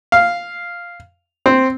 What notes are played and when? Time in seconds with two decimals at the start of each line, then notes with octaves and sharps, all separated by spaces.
0.12 F5
1.46 C4